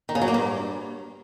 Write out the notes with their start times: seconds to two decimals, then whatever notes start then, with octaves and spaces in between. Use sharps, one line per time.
0.09 D#3
0.15 C#3
0.21 F#3
0.28 A#3
0.34 G2